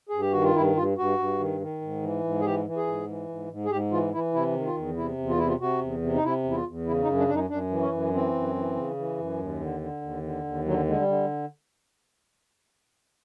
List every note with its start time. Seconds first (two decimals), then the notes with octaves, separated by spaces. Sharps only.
0.09 G2 G#4
0.20 G4
0.32 D#3 F#4
0.44 F4
0.55 G2 E4
0.76 G2 F4
0.97 G2 F#4
1.18 G2
1.39 D#3
1.60 D#3
1.81 G#2
2.03 E3
2.24 G#2
2.40 G#4
2.45 E3 G4
2.65 E3
2.76 G#4
2.87 G#2
3.08 E3
3.29 G#2
3.51 G#2
3.65 G#4
3.71 G#2 G4
3.91 E3 F4
4.13 E3 E4
4.34 C3 E4
4.55 D#3
4.66 F4
4.76 E2
4.97 C3 E4
5.18 E2
5.29 F4
5.38 C3 E4
5.48 F4
5.60 C3 F#4
5.81 E2
6.02 C3
6.14 D#4
6.23 C3 E4
6.44 E2
6.51 E4
6.55 F4
6.66 E2
6.87 C#3 E4
7.03 D#4
7.07 F#2
7.18 D4
7.28 F#2 D4
7.34 D#4
7.49 F#2 D4
7.71 E3
7.81 C#4
7.91 F#2
8.13 E3 C4
8.33 F#2
8.55 E3
8.76 C#3
8.96 E3
9.18 F#2
9.39 D#2
9.60 D3
9.81 D3
10.02 D#2
10.23 D3
10.44 D#2
10.65 D3 F#3
10.86 D3 G#3
10.97 G3
11.07 D3